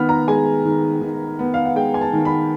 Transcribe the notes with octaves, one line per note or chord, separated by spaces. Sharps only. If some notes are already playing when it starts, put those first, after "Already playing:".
Already playing: D#3 B3 B5 F6
A#5
G#3 G#5
D#3
D#3
B3
F5
F#5
G#3 G5
G#5
A5
D#3
B5